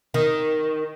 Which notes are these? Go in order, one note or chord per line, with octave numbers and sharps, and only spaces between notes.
D#3